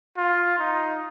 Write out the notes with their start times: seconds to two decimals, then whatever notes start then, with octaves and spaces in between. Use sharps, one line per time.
0.17 F4
0.58 D#4